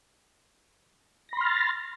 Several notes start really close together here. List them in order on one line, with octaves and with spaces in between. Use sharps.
A#6 B5 C6 F6 A6